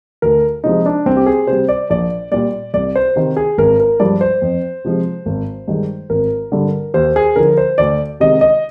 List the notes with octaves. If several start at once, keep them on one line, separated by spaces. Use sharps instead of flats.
D2 A#4
C3 F3 G#3 D#4
D4
C2 C4
G4
G#4
C3 G3 C5
D5
A#1 D5
A#2 G3 D5
C2 D5
C5
C3 D#3
G#4
G#1 A#4
A#4
G2 F3 G#3 D5
C5
F2
C3 F3 G#3
G#1
G2 D#3 G#3
G#1 A#4
G2 D3
D#2 C5
G#4
D3 F3 A#4
C5
D2 D5
C3 D#3 G#3 D#5
D#5